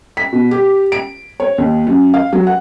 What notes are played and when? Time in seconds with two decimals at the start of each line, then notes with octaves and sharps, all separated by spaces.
0.17 B6
0.32 B2
0.51 G4
0.92 D7
1.40 C#5
1.58 D#2
1.87 F#2
2.14 F5
2.33 F#3
2.47 F#5